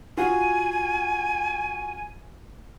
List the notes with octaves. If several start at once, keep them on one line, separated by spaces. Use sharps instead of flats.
F4 F#4 G#5